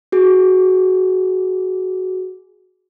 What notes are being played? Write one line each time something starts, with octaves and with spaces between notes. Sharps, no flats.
F#4 G#4